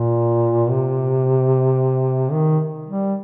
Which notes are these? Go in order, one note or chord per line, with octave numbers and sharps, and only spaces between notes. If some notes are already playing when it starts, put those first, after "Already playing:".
Already playing: A#2
C3
D#3
G3